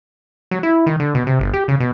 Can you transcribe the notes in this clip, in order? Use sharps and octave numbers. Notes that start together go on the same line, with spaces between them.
F#3
E4
D#3
D3
B2
C3
G1
G4
C#3
B2